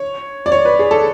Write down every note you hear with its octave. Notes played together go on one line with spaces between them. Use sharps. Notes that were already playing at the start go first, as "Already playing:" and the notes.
Already playing: C#5
D5
C#5
B4
G#4
A4